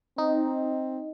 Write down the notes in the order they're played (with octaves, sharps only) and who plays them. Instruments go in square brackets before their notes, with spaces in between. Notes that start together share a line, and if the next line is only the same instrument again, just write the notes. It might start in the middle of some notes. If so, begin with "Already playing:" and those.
[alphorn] C4 [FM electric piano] D#4